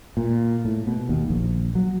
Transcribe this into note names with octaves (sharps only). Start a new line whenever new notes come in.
A#2
A2
B2
D#2
A#1
F#3